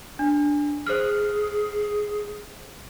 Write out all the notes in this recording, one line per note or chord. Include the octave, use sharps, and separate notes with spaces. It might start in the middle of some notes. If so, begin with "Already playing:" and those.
D4
G#4 C5 F6